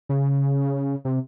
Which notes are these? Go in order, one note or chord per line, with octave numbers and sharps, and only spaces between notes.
C#3
C3